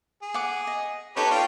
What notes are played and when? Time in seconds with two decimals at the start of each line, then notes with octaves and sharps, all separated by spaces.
0.22 G#4
0.34 F#5 D6
0.67 D#5
1.17 D#4 G4 A4 B4 C#5 D#5
1.31 F4 D5 G5